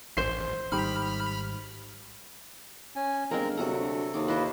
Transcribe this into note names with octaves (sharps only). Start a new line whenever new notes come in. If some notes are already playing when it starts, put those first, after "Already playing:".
A1 C5 C7
G#1 G3 D#4 G4 B5 F6
C#4 G#5
G1 G#3 A#3 C4 A#4 A#5
G1 C3 F#3 A4 A#5
D2
D#2 D6
E4 F4 B4 C5 D#5